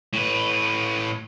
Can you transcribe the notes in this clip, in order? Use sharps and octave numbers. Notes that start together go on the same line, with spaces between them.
A2 B4